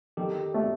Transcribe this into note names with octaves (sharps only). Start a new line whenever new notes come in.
D#3 G4 A4
A3